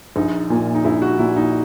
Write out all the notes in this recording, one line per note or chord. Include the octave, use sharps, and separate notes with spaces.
A#1 D#4
A#2 A#3
D#4
A#1 E4
F#4
A#2 A#3 E4
D#4